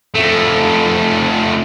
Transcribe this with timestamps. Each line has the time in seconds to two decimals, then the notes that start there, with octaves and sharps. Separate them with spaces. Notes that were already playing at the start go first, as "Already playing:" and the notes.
0.15 F2 A3